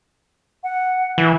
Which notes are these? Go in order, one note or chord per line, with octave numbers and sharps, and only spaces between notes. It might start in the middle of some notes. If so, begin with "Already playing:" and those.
F#5
E3